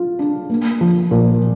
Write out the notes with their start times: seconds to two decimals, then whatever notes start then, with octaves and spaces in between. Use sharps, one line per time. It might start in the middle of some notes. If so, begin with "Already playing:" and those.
Already playing: F4
0.19 D4
0.50 A#3
0.81 F3
1.11 A#2